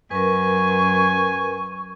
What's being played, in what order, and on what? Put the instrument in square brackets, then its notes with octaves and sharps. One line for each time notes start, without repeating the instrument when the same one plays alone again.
[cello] F#2 [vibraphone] A#4 B4 [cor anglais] G#5 [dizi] C#6